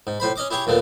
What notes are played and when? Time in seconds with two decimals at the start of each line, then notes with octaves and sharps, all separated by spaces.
0.07 G#2
0.20 A2 C5 B5
0.36 C#4 D#5 D6
0.50 E4 G4 G#4 C#5
0.67 D#2 A#2 A3 B3